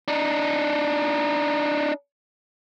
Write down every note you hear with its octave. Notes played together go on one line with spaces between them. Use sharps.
D4 D#4